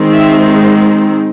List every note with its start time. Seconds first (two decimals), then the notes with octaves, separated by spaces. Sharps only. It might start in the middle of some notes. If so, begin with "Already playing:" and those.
Already playing: D#3 G#3 C4
0.12 E5